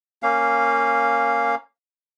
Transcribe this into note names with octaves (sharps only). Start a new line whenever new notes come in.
A#3 C#4 F5